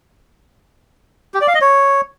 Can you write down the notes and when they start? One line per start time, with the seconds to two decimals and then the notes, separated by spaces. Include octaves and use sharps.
1.34 G4
1.41 D5
1.48 F5
1.55 D#5
1.61 C#5